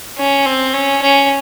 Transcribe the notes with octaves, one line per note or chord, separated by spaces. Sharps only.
C#4
C4
C#4
C#4